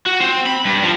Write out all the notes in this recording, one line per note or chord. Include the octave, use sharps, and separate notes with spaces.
F#4
C4
B5
G2
F3